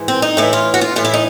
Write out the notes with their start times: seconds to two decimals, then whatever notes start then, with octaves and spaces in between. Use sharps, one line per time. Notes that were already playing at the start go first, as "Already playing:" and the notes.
Already playing: G#2 E3
0.08 C4
0.22 D#4
0.37 A2 E3 E4
0.53 F4
0.74 F#4
0.81 F4
0.96 A2 E3 F4
1.05 E4
1.14 D#4